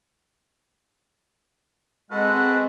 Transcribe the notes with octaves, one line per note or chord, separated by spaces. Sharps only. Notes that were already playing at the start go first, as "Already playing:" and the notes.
G#3 C4 F#4 A4 B4 F#5